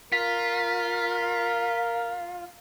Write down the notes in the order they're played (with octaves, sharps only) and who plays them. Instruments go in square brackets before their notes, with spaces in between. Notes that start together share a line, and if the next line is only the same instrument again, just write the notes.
[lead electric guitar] F4 [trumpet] A#4 [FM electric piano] B6